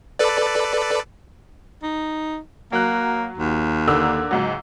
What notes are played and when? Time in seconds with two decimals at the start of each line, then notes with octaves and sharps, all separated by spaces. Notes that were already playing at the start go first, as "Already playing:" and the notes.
0.19 A4 B4 D5
1.83 D#4
2.72 F#3 A#3 F#6
3.38 D#2
3.87 D3 A#3 E6
4.31 C#2 G#2 F#3